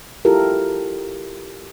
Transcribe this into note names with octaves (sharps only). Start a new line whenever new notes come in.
E4 F4 G4 A4 A#4